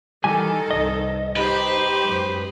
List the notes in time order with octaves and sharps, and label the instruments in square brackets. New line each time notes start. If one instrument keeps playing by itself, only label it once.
[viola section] D#3 A4 [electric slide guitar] E3 G3 G#5
[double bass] C2 G2 [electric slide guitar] D#5
[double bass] D#4 [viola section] G4 C5 [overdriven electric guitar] B4
[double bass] F#2 G#3